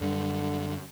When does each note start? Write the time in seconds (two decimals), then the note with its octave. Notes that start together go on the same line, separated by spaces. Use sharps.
0.01 F#2 D3 G3